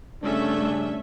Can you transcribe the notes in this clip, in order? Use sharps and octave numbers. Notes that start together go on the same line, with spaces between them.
G2 C#3 A3 C#4 D4 E5